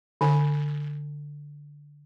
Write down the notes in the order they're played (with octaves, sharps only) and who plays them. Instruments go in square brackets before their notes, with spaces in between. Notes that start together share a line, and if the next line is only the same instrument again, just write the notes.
[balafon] D3 G#5